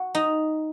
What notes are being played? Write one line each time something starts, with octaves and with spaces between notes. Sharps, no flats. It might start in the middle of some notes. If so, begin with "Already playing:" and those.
Already playing: F#4
D#4